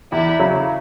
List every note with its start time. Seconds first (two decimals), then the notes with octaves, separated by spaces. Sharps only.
0.12 E2 E4
0.39 C#3 F#3